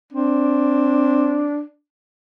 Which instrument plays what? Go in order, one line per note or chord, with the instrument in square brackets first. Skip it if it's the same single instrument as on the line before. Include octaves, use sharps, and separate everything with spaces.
[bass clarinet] C4 [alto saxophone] D4